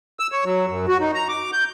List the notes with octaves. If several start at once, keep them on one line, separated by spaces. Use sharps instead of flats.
E6
C#5
F#3
F#2
F#4
D#4
A#5
D6
G6